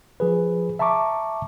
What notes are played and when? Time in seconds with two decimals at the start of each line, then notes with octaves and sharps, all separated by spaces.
0.20 F3 G#4 B4
0.79 E5 A5 A#5 C#6 D6